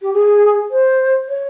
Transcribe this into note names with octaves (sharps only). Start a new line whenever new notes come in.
G4
G#4
C5
C#5